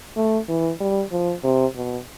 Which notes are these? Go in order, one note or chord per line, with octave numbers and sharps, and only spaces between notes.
A3
E3
G3
F3
C3
B2